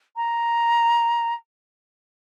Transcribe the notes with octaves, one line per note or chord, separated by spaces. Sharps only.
A#5